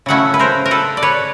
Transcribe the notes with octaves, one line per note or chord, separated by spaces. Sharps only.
C#3 F#3 A3 C#4 E4 E5 F#5
B4
A#4 C5
A#4
A4 B4
D5
B4 C#5